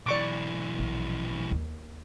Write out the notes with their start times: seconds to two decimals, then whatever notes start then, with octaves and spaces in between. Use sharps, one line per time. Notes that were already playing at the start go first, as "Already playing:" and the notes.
0.06 B1 E3 D5 C#6 D6
0.79 A#1 F3
1.51 D#2